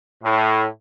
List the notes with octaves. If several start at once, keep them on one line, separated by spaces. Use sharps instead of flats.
A2